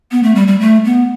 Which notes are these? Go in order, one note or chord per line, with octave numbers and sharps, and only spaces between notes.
B3
A3
G3
G3
A3
B3